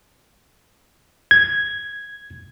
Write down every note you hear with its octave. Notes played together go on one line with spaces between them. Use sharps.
G#6